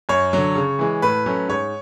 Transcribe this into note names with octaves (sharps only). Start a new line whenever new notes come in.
F#2 C#5
D3 F#3
C#3
E3 G#3
A2 B4
F#3 A3 C#4
G#2 C#5